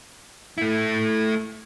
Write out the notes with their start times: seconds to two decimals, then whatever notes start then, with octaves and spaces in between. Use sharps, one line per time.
0.58 A3 E4